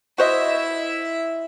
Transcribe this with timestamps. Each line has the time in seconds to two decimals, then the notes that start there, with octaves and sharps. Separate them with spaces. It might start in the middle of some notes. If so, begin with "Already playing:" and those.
0.18 E4 F#4 C5 D#5 E5